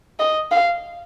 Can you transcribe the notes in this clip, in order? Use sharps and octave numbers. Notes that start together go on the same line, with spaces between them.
D#5
F5